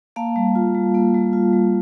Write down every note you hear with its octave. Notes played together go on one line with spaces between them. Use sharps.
A#3 F5 A5
G3
F4
G3
A#3
G3
F4
G3